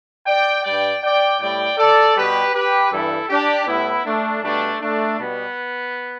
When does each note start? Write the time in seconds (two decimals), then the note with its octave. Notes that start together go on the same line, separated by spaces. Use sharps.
0.27 D5 G5
0.64 G2 G3 D5 G5
1.03 D5 G5
1.41 A2 G3 D5 G5
1.78 A4 D5
2.16 B2 G3 G4 B4
2.54 G4 B4
2.91 G2 E3 G3 E4 A4
3.29 D4 G4
3.67 A2 G3 B3 E4
4.05 A3 D4
4.43 B2 G3 A3 D4
4.80 A3 D4
5.18 B2 G3 B3